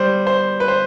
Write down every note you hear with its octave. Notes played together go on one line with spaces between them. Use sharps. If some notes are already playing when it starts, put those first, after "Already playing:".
Already playing: G3 C5
C5
B4
C5